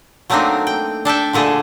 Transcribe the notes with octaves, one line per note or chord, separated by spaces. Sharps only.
F#3 A3 A#3 C4 D4 D#4
G5
D4 A4 E5 G5
A#2 D3 A3 G#4 A4